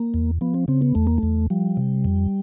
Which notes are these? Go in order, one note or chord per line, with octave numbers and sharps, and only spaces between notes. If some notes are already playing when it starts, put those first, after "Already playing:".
Already playing: A#3
E2
F3 B3
C4
C#3 C4
B3
E2 A3
A#3
E2 A3
F3 G3
C3
F2